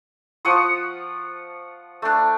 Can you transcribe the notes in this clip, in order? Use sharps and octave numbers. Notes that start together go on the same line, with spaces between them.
F3 F#5 C#6 D#6
A3 D4